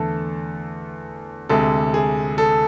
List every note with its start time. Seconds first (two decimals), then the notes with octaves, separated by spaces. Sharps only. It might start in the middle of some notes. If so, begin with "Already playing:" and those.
Already playing: E2 D3 A3 A4
1.49 D2 C3 G#3 A4
1.94 G#4
2.38 A4